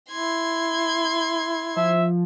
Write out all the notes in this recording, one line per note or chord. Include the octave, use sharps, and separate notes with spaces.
E4 C6 G#6
F3 E5